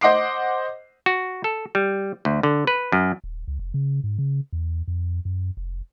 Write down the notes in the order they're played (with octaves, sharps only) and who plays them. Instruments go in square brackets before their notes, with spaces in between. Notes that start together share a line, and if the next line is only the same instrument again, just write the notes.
[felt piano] C5 D#5 F#5 D6 C7
[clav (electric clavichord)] F#4
A4
G3
D2
D3
B4
F#2
[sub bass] D#1
C#2
F1
C#3
G#2
C#3
E2
F2
F#2
F1